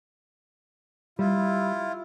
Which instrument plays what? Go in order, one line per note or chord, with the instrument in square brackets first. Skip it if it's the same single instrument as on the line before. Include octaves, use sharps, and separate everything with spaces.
[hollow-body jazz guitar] G3 [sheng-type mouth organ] E4 F4